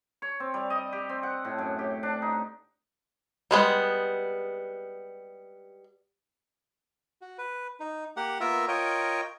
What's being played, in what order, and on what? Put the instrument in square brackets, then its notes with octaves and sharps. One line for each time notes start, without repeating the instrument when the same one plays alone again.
[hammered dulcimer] C#5
C4
G3
D#5
G4
C4
F#5
A2
F#2
G4
D4
D#4
[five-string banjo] G3 G#3 B3
[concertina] F#4
B4
D#4
A#3 G4 F#5
A#3 B3 F4 A#4 E5
F4 A#4 C#5 D#5 G5